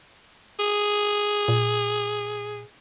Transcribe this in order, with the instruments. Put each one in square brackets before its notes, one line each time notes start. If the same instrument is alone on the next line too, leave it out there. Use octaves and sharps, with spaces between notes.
[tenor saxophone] G#4
[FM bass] A#2